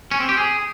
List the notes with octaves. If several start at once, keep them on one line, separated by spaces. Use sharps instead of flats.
C#4
C4
G4
G#4